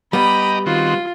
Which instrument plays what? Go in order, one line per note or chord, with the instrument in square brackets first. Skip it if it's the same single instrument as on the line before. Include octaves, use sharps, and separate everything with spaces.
[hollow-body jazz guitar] G3 B3 [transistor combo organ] G4 D#5 A#5 [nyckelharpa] B5
[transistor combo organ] D#3 C4 F#4 [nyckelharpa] F4